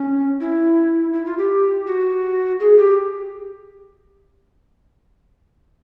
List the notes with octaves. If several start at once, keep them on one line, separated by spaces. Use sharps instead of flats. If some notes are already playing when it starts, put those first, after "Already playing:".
Already playing: C#4
E4
E4
F4
G4
F#4
G#4
G4